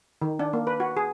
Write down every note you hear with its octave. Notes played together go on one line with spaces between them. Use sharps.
D#3
D4
A#3
B4
F#4
G#4